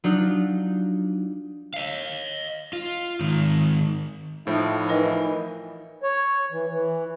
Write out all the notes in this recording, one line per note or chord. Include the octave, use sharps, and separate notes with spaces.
F#3 D4 D#4 F4
D#5 F5
F4
G#2 D#3
A2 F3 D#4 E4
E3 A#4 D#5
C#5
E3
E3